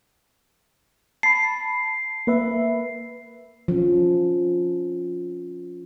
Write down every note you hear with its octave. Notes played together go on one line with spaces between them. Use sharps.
A5 B5 C7
A#3 B4 E5
F3 C#4